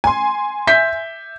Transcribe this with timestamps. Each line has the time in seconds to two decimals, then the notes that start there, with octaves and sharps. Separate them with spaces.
0.04 G#5 C6
0.67 E5 G6 B6